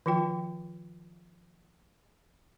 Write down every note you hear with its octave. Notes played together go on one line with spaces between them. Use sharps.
D#3 F3 F4 G5